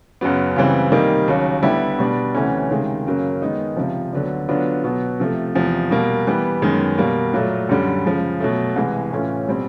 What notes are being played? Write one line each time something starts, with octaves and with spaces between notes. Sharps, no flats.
F#2 C#3 F#3 B3
C#2 C#3 E3 G3 C4
C3 D#3 G3 A#3 D#4
D#2 C#3 F#3
D3 G3 B3 E4 G4
B2 G3 B3 D4
D2 C3 E3 A3 C#4
C#2 C3 D#3 G#3
F#2 C#3 F#3 A#3
D#3 G#3 B3 D#4
C#2 C3 F3
D2 D3 F#3 B3 D4
D3 F#3 B3 D4 F4
B2 F#3 B3
C3 F3 A3
E2 C3 F3
B2 G3 A#3
E3 G3 B3
F#2 D#3 G#3 B3
B2 G3 A#3
A#2 F#3 A3
F#2 D3 G3
C#3 F3 G#3
B2 F#3 A3
C2 C3 E3 G#3
A2 E3 A3 C#4 F4
B2 G3 C4